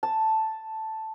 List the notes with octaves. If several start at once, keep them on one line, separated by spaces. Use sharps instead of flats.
A5